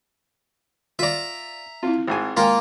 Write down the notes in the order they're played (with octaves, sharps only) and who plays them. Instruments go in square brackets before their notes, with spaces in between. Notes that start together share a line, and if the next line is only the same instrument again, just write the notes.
[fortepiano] F4 D5 [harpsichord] E5 A#5
[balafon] C4 E4 [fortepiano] F4
[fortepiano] G#1 G#2 G#5
[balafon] G#3 G5 G#5 [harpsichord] A#3 F4 [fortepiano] A#4 F5